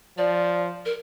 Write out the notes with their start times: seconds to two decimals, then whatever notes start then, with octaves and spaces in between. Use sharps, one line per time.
0.18 F3 D5
0.85 A#4